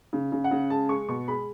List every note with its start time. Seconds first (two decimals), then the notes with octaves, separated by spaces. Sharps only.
0.13 C#3
0.32 C#3
0.44 F#5
0.51 C#3
0.70 G#3 A5
0.89 G#3 C#6
1.09 B2 C#6
1.28 G#3 B5